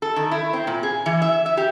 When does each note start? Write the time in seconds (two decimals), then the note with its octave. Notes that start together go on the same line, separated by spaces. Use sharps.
0.02 A4
0.16 D#3
0.31 E4
0.53 C4
0.67 A#2
0.83 G#4
1.06 E3
1.22 E5
1.46 E5
1.57 G4